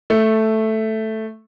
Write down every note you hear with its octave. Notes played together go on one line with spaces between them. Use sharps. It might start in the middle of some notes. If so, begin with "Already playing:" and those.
A3